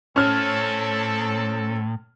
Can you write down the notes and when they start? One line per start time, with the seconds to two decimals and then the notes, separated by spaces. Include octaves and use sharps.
0.16 A2 C4 C#4 A4 F6